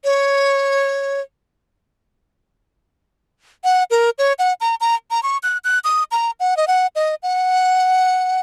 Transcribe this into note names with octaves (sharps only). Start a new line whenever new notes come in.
C#5
F#5
A#4
C#5
F#5
A#5
A#5
A#5
C#6
F#6
F#6
D#6
A#5
F#5
D#5
F#5
D#5
F#5